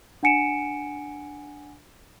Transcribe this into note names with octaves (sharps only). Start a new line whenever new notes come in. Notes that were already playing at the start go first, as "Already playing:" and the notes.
D4 F#5 G#5 C#7 D7 E7